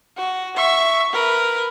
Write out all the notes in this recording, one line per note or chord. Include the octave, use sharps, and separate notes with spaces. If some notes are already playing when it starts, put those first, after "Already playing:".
F#4
E5 C#6
A#4 B4